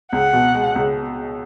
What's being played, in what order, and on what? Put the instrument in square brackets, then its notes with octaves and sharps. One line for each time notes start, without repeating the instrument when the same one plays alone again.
[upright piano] C#2 [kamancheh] F#5
[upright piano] B2
G#3
C#2